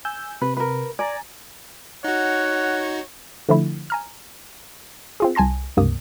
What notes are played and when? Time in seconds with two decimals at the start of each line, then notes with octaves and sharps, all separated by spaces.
0.05 G#5 E6 G6
0.42 C3 B4
0.57 A#4 B4
0.99 D5 G#5 A#5 A6
2.04 D#4 F#4 C#5 F#5
3.49 D3 F3 A3 E4
3.90 G#5 A#5 F6
5.20 C4 F4 G#4
5.35 C2 G#5 A5 C6 A#6
5.77 C#2 G2 C3 A#3 D#6